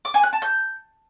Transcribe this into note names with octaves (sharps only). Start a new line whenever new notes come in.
D6
G#5
F#6
A5
G6